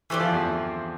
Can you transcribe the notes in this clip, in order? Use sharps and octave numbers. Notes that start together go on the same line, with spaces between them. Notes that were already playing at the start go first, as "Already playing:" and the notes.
E3 A3 C4 G4 D5
F3
E2 E3